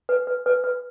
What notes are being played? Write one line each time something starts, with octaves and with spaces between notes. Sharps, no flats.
B4
B4
B4
B4